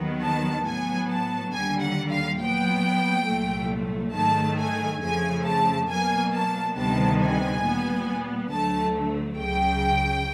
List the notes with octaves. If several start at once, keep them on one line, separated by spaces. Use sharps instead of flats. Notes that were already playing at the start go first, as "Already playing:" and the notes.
Already playing: D#2 D#3 F#3 B3
A5
A2 F#3 B3 G#5
A5
D#2 D3 G3 G#5
F#5
F5
A#2 F#3 B3 G5
C2 A#2 F#3 A3
G#2 D#3 F#3 A3 A5
G#5
F2 C#3 F3 A3 G#5
A5
B2 F#3 A#3 G#5
A5
D2 C3 D#3 G3 B3 A5
G#5
A#2 G3 B3
D2 D3 F#3 A3 A5
C#2 C#3 F#3 G5